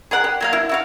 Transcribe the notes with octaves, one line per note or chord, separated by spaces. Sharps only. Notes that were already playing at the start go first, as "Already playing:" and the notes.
G#4 A#4 F#5
G4
F#3 A#3 F5
E4
E4 F#4 F5